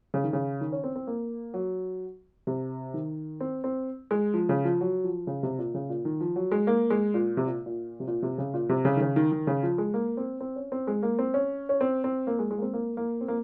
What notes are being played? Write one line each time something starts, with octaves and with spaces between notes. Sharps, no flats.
C#3
D#3
C#3
D#3
C#4
C4
C4
A#3
F#3
C3
D#3
C4
C4
G#3
F3
C#3
F3
F#3
F3
C#3
C3
A#2
C#3
A#2
D#3
F3
F#3
G#3
A#3
G#3
A#2
C3
A#2
A#2
C3
A#2
C3
C#3
A#2
C3
C#3
D#3
C#3
D#3
D#3
C#3
F3
G#3
A#3
C4
C4
C#4
C4
G#3
A#3
C4
C#4
C#4
C4
C4
A#3
G#3
G#3
A#3
C4
A#3
A#3
C4
A#3